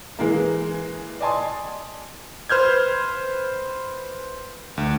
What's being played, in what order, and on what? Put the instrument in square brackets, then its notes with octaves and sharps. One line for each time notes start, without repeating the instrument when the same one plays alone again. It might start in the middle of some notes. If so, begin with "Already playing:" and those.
[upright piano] E3 G#3 A#3
D5 D#5 G#5 A5 C6 D#6
[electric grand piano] B4 C5 F6 G6 G#6
D2